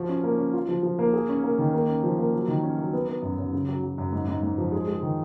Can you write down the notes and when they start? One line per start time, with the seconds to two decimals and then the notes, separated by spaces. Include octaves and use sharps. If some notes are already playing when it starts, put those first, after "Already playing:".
Already playing: F3 F#4
0.09 C#4
0.24 A#3
0.39 C#4
0.53 F4
0.68 F3
0.83 F3
0.99 A#3
1.13 G#4
1.29 C#4
1.44 A#3
1.59 D#3
1.74 A#3
1.88 C#4
2.03 F3
2.19 A#3
2.33 F#3
2.48 D#3
2.63 C#4
2.78 F#3
2.93 B3
3.09 B3
3.22 F#2
3.38 F#2
3.53 C#3
3.68 F#3
3.83 F#3
3.98 F#2
4.13 G#2
4.28 G#2
4.43 G#2
4.58 F3
4.72 G#3
4.88 G#3
5.02 D#3